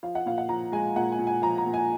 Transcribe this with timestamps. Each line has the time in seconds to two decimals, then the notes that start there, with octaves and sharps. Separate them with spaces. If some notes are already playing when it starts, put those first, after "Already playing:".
0.03 F3 F5
0.15 F#5
0.26 A#2 F5
0.38 F#5
0.49 F3 A#5
0.72 G#3 G#5
0.96 A#2 F#5
1.12 G#5
1.19 A#2
1.27 G#5
1.42 F3 A#5
1.58 A#5
1.66 A#2
1.74 G#5